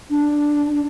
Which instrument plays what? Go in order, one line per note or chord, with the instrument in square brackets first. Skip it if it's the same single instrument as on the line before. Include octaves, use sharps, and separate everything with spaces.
[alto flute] D4